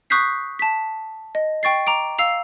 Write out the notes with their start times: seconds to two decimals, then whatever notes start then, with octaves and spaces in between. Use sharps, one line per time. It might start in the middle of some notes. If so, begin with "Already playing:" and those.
0.10 C#6 D#6 F#6 G6 B6 C7
0.59 A5 B6
1.35 D#5
1.63 G5 C#6 A6 C7
1.87 A#5 D6 D7
2.19 F5 E6 C7 F7